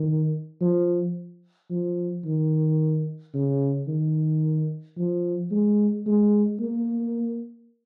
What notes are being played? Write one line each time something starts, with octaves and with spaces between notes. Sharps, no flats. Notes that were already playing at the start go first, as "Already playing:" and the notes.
Already playing: D#3
F3
F3
D#3
C#3
D#3
F3
G#3
G#3
A#3